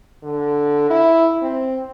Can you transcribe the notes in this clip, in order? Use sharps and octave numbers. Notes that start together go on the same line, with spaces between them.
D3
E4
C4